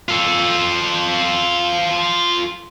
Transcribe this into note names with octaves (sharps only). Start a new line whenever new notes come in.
F4 A4